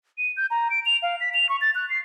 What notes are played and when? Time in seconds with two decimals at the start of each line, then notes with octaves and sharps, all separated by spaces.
0.18 D#7
0.37 G6
0.51 A#5
0.71 D7
0.86 F7
1.03 F5
1.20 B6
1.34 F7
1.49 C#6
1.61 A6
1.75 F#6
1.90 C7